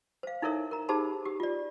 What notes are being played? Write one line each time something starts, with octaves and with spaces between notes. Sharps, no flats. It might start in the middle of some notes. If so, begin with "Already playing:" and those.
C5 F5
D#4 E4 A4 A#4 C#5 E5
A#4 A#5
D#4 G4 G#4 C5 A5 B5
G4
F4 D5